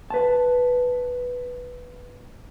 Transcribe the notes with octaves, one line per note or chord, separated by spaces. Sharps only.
B4 A5